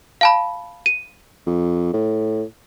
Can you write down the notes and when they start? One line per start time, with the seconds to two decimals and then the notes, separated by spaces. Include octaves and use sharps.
0.21 F5 A5 B5
0.86 D#7
1.46 F2
1.93 A2